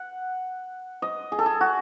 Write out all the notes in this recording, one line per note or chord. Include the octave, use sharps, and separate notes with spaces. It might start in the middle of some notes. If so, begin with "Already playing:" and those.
Already playing: F#5
D#5
G#4
A4
G#4
F#4